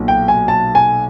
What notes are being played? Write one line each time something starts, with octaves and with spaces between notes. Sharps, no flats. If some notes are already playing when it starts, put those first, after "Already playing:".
Already playing: B1 A#2
G5
G#5
A5
G#5